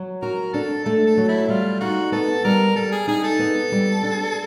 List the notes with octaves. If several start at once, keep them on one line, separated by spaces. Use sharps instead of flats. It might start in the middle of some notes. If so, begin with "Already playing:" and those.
Already playing: F#3
F#4 A#4
D4 A4
A3 A4
A4
F#3
E4
G3 F4
D#4 F#4
B3 A4
G3 A#4
G3 A4
G#4
D#4 G#4
A4
B3
G3
D4